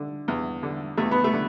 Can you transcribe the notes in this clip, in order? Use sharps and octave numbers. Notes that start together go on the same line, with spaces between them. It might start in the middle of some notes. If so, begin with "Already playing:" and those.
Already playing: D3
E2
D3
E2 A3
B3
A3
D3